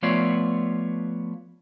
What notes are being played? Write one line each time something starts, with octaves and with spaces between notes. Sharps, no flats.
F3 A3 B3 F4 C#5 D5